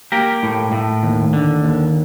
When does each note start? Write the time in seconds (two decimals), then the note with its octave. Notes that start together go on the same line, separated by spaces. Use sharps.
0.12 A#3 G4 A#4
0.43 A2
0.72 A2
1.03 D#2
1.33 D3
1.64 D#2